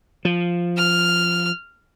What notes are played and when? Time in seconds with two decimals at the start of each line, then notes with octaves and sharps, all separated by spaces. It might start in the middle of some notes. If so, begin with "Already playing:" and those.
0.25 F3
0.77 F6